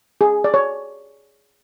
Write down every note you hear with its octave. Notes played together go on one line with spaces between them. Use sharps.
G#4
D5
C#5